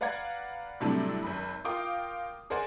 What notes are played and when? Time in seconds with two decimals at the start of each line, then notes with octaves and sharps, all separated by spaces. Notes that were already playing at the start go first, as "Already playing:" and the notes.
0.01 B4 D5 F5 F#5 A#5 G#6
0.80 A2 C3 F#3 G3 D4 A4
1.23 G#1 F#2 B5
1.65 F4 A#4 F5 G5 D6 D#6
2.50 G#4 A#4 C5 D5 F#5 G#5